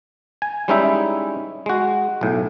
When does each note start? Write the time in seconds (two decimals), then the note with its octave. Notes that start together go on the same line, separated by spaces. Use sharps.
0.42 G#5
0.68 G3 G#3 C#4 D#4 E4 E5
1.66 G#3 F#4
2.21 B1 A2